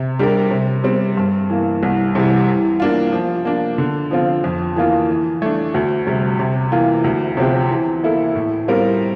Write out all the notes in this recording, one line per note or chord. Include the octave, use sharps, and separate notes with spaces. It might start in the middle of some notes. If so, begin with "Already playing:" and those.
Already playing: C3
G3 D4 G4 A#4
C3
G3 C4
G2
E3 A#3
C2
C3 E3 G3
E3
A#3 D4 F4
F3
A#3 D4
D3
F3 C4 F4
F2
E3 A#3 F4
E3
A3 D4
D2
C3 G3
C3
E3 A#3 F4
D2
C3 F3 C4 G4
E3
A#3 E4 A4
A2
G3 C4 F4 A#4